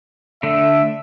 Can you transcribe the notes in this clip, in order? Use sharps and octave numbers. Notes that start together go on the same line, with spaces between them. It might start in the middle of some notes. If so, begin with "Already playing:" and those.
D3 A3 E5